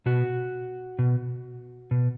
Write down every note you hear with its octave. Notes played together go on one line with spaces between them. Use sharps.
B2 F#4
B2
B2